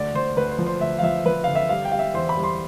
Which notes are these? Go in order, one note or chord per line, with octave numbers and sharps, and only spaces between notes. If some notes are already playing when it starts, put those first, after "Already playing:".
Already playing: D2 D5
D2 C5
D2 B4
C5
F3
C5
D2 E5
F5
F3 E5
F3 B4
D3 F5
E5
G3 F5
G5
G3 F5
E5
E2 C5
B5
G3
C6